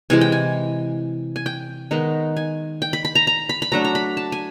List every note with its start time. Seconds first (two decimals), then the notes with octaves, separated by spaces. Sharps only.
0.10 C3 E3 G#3 G#5
0.21 G5
0.32 G#5
1.36 G#5
1.46 G5
1.91 D#3 G#3 B3 D#4
2.37 G#5
2.82 G5
2.93 B5
3.05 B5
3.15 A#5
3.27 A#5
3.49 B5
3.62 B5
3.72 F#3 A3 D4 A#5
3.85 A#5
3.95 B5
4.17 A5
4.32 G#5